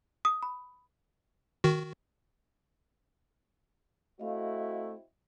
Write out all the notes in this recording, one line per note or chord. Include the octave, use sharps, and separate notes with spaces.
D#6
B5
D#3 F#4
A3 C4 E4 F#4 D#5 F5